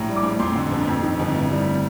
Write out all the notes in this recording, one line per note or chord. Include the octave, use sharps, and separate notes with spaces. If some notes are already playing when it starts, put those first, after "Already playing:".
Already playing: A#1 A2 A#5
G3
D6
A#1
F2 C6
D3
G1
F2
D#3
G1
A2
G3